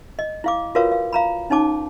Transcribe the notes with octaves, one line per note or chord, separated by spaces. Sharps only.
D#5
E4 F5 D6
F4 F#4 A#4 B4 C#5 F5
F5
F5 A#5 B5
C#4 D#4 C#5 A5 D6